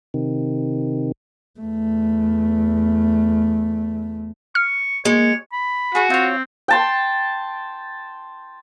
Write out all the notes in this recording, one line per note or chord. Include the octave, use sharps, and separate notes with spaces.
C3 D#3
E2 A3
C#6 F6
G#3 A#3 C#5
B5
F#4 G#4 C#6
C4 F4 C#5
G5 A5 C6